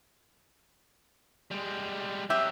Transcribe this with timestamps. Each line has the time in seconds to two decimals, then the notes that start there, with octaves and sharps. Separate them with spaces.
1.51 G3 G#3
2.30 C3 F#3 G4 E5